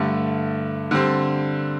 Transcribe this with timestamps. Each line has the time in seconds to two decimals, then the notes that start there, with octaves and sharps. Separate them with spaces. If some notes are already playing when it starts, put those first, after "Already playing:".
Already playing: G2 D3 A3
0.91 D3 G3 C4